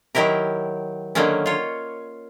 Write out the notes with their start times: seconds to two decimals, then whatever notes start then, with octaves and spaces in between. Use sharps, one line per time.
0.15 D#3 F#3 E4 G4 A#4
1.15 D3 D#3 F#3 A#3 C#4
1.46 F4 C#5